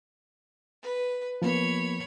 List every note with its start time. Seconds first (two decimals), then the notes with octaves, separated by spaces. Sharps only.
0.82 B4
1.42 F3 A#3 B3 C#5 B5